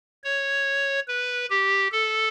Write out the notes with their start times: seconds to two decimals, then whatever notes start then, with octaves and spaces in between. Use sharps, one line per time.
0.24 C#5
1.08 B4
1.50 G4
1.92 A4